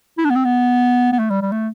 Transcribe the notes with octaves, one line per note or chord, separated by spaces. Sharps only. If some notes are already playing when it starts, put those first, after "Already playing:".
E4
D4
B3
C4
B3
B3
A3
G3
G3
A3